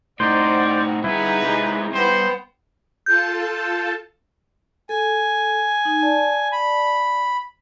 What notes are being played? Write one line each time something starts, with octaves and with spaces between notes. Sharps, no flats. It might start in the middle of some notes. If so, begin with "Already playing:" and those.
A2 C4 D#4 F#4 C5 D5
G2 B3 D#4 E4 G#4 B4
C3 G#3
G2 B3 C5 F#5 G5
F4 A4 A5 G6
A4 G#5
D#4
D5 A5
B5